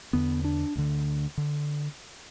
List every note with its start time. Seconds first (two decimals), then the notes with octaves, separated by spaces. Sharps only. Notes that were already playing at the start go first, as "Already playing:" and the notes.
0.13 E2 D3 B3
0.45 D4
0.76 D2 D3
1.38 D3